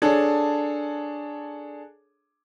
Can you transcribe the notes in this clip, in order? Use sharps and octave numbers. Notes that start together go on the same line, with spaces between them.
D4 G#4 A4 C#5